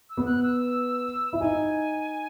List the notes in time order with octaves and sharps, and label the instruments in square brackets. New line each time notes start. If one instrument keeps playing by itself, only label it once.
[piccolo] E6
[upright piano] B3 B4
[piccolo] F#6
E6
[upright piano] E4
[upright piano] D#4 [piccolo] G#5